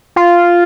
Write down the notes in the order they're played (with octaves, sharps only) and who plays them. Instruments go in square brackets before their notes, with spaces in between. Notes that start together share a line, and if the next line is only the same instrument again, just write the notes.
[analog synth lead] F4